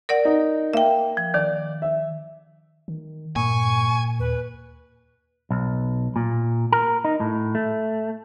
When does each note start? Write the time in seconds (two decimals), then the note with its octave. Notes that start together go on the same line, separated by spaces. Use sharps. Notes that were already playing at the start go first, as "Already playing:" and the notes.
0.09 A#4 D5 F#5
0.25 D#4
0.73 A#3 E5 G5
1.17 F3
1.34 D#3 D5
1.82 E5
2.88 D#3
3.36 G2 A#2 G#5 C#6
4.20 D#2 B4
5.51 B1
6.16 A#2
6.72 A#4
7.05 D#4
7.20 A2
7.55 A3